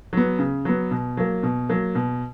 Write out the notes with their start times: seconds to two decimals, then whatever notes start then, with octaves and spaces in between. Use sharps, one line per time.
0.13 F#3 B3
0.39 C#3
0.65 F#3 B3
0.91 B2
1.17 F#3 A#3
1.43 B2
1.69 F#3 A#3
1.95 B2